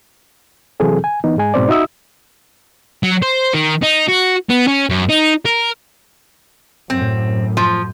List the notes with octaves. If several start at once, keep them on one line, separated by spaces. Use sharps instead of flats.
C3 E3 F#3 C4 G#4 A4
G#5
E3 B3 D#4
G#2 G#3 G#5
G#2 B2 C4 C5 D5
D#4 F#4 E5 D#6 E6
F#3
C5
D#3
D#4
F#4
B3
C#4
F#2
D#4
A#4
F#2 A2 C4
F3